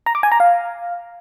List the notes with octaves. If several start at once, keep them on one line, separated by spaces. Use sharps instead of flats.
A#5
D6
G#5
A#5
F5